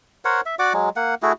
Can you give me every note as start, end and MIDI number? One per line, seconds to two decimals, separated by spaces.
0.25 0.41 70
0.25 0.41 72
0.25 0.41 73
0.25 0.41 78
0.46 0.55 76
0.59 0.73 66
0.59 0.73 74
0.59 0.73 78
0.59 0.73 86
0.74 0.89 54
0.74 0.89 56
0.96 1.15 58
0.96 1.15 78
1.22 1.32 57
1.22 1.32 64
1.22 1.32 66
1.22 1.32 68